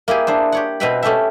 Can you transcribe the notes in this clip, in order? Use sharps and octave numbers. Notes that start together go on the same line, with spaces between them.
A#3 E4 G4 G#4
D4 E4 C5
G4 C#5 F#5
B2 C4 B4 E5 G5 B5
A3 C#4 G4 A4 E5